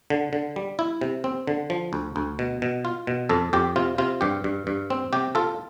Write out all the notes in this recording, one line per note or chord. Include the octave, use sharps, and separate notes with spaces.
D3
D3
G3
E4
C3
C4
D3
F3
D2
D2
B2
B2
F4
B2
F2 A4
F2 G4
C3 F4
C3 F4
G2 G4
G2
G2
C4
C3 G4
F4 A4